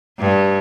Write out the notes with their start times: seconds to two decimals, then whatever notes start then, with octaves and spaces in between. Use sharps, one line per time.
0.19 G2